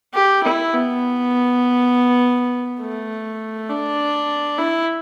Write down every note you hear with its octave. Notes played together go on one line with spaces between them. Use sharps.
G4
E4
B3
A3
D4
E4